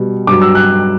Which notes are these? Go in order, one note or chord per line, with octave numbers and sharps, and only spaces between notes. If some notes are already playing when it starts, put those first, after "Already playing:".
Already playing: B2 G3
G2 F#3 D6
E6
F#6